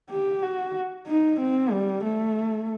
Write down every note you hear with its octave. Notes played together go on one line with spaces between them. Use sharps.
G4
F#4
D#4
C4
G3
A3